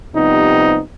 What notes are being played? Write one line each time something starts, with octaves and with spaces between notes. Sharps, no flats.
C3 F3 G3 B3 D#4